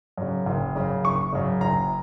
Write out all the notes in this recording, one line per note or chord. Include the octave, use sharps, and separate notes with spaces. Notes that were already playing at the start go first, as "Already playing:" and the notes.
F#2 C#3
F#1
F#2 C#3
F#1 C#6
F#2 C#3
F#1 A#5